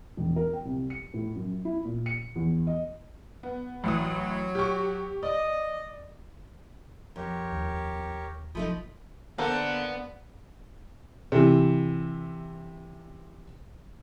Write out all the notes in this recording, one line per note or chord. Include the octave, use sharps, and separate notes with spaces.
E1
A#4
G5
C2
C#7
A2
F#2
E4
A#2
C#7
E2
D#5
B3
A1 F#3 E4 D#6
G4 C#6
D5 D#5
F2 G4 A#4 C#5
D#2
F1 F3 A3 D#4 B5 D#6
D3 A#3 B3 A4 C5 F#5
C3 E3